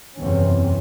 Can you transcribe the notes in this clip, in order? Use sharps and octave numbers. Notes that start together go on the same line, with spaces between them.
F#1 E2 C3 C4 C#4